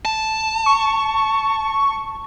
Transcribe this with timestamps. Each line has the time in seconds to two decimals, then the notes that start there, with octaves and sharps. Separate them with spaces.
0.05 A5
0.66 C#6